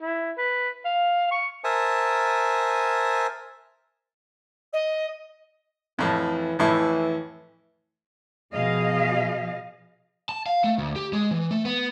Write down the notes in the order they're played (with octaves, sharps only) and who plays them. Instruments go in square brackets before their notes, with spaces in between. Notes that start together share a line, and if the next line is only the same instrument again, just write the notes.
[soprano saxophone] E4
B4
F5
C#6
[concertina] A#4 C5 E5 G#5 A5 D#6
[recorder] D#5
[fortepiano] F2 A2 [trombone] E3
[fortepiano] F2 A2 E4 [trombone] E3
[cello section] B2 F3 G#4 D#5 F5
[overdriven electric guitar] A5
F5
A3
D2
G4
G#3
E3
A3
B3